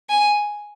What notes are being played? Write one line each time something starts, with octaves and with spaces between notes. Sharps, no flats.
G#5